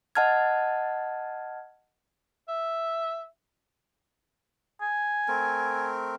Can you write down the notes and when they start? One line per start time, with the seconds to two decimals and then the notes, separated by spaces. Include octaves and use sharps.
0.15 D#5 F#5 A5 F6 G#6
2.48 E5
4.81 G#5
5.28 A3 C4 A#4